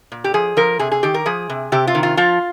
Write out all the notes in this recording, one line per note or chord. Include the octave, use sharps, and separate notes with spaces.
A#2
G4
F3 G#4
F3 A#4
C3 G#4
G#4
D#3 G4
A#4
F3 G#4
C3
C3 G4
F4
D#3
F4
F3 F4